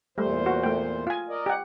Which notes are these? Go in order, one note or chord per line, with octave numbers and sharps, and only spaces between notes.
E2 A#2 G3 A3 C5
F#4
A3 G5
F4 G#5
A#4 D5 D#5
G4 F#5